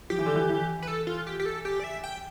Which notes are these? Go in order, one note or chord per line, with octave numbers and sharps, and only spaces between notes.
F3 G4
E3
D3
E3
E3
B4
A4
F4
G4
G4
A4
G4
D5
E5
G5